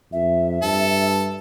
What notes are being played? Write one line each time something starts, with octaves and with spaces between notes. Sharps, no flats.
F2 E5
G2 A4